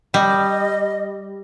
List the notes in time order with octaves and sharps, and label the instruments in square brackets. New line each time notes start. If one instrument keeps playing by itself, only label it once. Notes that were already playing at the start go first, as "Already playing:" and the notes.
[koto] G3 [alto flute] D#5